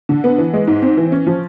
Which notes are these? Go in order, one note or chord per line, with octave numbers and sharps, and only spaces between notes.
D3
B3
E3
G#3
G#2
C4
E3
C#4
F3